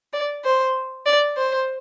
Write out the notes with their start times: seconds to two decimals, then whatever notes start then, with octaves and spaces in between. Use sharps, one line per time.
0.13 D5
0.44 C5
1.06 D5
1.37 C5